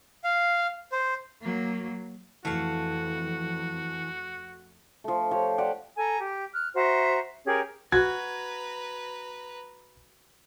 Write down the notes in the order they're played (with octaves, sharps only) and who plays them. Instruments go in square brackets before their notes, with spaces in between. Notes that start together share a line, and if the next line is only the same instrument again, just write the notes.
[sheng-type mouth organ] F5
C5
[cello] F#3 A#3
[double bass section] F2 [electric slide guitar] E3 [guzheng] A3 F5 [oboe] F#4
[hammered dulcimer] F3 A3
F3 G4 C#5
G4 C5 D5 F#5
[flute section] A4 G#5 A#5
G4
F6 F#6
F#4 C5 E5 A#5
C#4 G4 G#4 A#4
[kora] F#4 [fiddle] B4 A#5 [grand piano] G#6